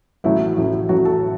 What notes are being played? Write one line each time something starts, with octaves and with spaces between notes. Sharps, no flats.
A1 A2 F#3 A3 E4
A1 A2 F#3 A3
A1 A2 F#3 A3 F#4
A4